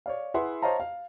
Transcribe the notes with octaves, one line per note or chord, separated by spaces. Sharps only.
C#5 D5 F5
E4 G#4 B4 E5 F#5 C6
C5 C#5 D#5 F5 A5 A#5
F5